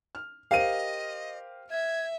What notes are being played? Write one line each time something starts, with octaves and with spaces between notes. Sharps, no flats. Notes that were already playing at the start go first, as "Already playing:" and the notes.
F6
G4 A#4 C5 D#5 F5 D#7
E5 G#6